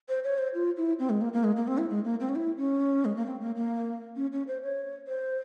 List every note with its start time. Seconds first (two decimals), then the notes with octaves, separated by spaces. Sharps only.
0.09 C5
0.24 C#5
0.38 C5
0.54 F4
0.77 E4
0.99 C4
1.10 G#3
1.21 A#3
1.33 A#3
1.44 G#3
1.56 A#3
1.67 C4
1.78 E4
1.89 G#3
2.04 A#3
2.20 C4
2.29 C#4
2.36 E4
2.58 C#4
3.05 G#3
3.16 A#3
3.26 C4
3.41 A#3
3.56 A#3
4.16 C#4
4.32 C#4
4.47 C5
4.63 C#5
5.07 C5